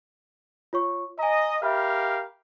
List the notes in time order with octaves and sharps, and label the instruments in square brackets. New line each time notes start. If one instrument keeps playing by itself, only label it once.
[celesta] F4 C#5 C#6
[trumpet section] D#5 [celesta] G#5 A#5
[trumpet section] G4 A#4 F5 [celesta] E5 B5 F6